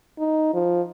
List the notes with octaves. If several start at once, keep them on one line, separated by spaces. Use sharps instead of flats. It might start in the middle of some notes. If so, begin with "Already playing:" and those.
D#4
F3